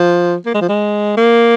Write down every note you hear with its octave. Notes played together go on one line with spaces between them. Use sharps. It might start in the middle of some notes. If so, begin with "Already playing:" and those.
Already playing: F3
A#3
G#3
F3
G#3
A#3